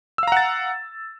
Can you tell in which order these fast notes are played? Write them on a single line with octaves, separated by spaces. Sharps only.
E6 F5 A#5 F#5 A6